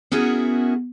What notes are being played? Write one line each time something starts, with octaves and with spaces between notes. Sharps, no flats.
B3 C#4 E4 F#4 G#4 A#4